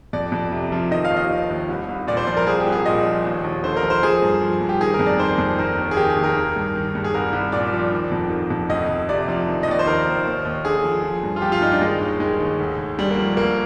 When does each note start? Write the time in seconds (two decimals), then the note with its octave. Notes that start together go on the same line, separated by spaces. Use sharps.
0.13 F2 D5
0.32 F2
0.52 C3
0.72 F3
0.91 D#3 D#5
1.05 F5
1.11 D#2
1.17 D#5
1.30 D#3
1.50 D#2
1.69 C2
1.89 C2
2.07 A#2 D5
2.17 C5
2.27 F3 D5
2.37 A#4
2.46 C2 G#4
2.60 G4
2.66 C2
2.72 G#4
2.86 A#2 D#5
3.05 F3
3.25 D#2
3.44 D#2
3.64 D3 C5
3.77 A#4
3.83 F3
3.90 C5
4.03 F3 G#4
4.22 G2
4.41 F3
4.61 G2
4.69 G4
4.81 D#3 G#4
4.94 A#4
4.99 F2
5.07 D5
5.19 D#3 C5
5.38 F2
5.59 D#3 A#4
5.77 D#2
5.91 G#4
5.97 D#3 G4
6.10 G#4
6.17 D#2
6.24 A#4
6.36 D#3
6.56 G2
6.75 D#3
6.95 G2
7.04 G#4
7.14 C2 A#4
7.33 C2
7.52 A#2 D5
7.73 F3
7.91 D#3
8.12 F2
8.30 D#3
8.50 F2
8.69 D2 D#5
8.89 D2
9.09 C3 D5
9.28 F3
9.47 D#3
9.63 D#5
9.68 D#2 D5
9.79 C5
9.86 D#3 A#4
10.06 D#2
10.25 D#2
10.45 D#2
10.65 D3 G#4
10.84 F3
11.04 F3
11.23 G2
11.36 F4
11.42 F3 G4
11.52 F4
11.61 G2 D#4
11.72 D4
11.81 D#3 G#3
12.01 D#2
12.20 D#3 G#3
12.40 D#2
12.59 D2
12.78 D2
12.97 D3 G3
13.11 A#3
13.18 F3
13.37 D2 A#3